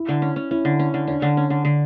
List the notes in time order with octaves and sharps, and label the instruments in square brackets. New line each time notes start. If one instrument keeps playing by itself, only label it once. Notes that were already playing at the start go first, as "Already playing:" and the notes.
Already playing: [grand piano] E4
[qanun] D3
C#4
C#4
[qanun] C#4 [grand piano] E4
[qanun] D3
C#4
D3
[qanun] C#4 [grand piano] D4
[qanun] D3
C#4
D3
D3